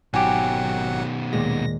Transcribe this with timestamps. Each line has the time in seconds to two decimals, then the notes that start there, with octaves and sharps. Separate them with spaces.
0.14 G#1 B2 D#3 F#3 G4 F#5 G#5
1.33 D#2 A#2 G#3 A#6